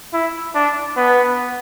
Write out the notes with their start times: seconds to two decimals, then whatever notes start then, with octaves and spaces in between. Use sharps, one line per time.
0.13 E4
0.55 D4
0.97 B3